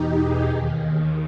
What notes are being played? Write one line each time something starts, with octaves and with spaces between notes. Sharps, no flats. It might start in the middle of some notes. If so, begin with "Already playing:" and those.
Already playing: E2 B2 D#4 G4
G#4
D#2 D#3